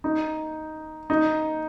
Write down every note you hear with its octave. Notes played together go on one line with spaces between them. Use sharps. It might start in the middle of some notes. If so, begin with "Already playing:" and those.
D#4
D#4